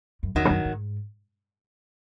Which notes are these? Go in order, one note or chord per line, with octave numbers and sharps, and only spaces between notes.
F#2
E2 D#3 F#3
G#2
F#2
G#2